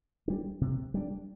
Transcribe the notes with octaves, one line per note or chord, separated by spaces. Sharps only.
G3 D4
C3
G3 D4